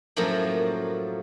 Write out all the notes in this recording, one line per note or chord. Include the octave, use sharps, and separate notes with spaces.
F#2 A2 F3 F#3 A3 A#3